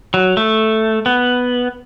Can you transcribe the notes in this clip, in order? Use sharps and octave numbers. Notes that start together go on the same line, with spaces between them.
F#3
A3
B3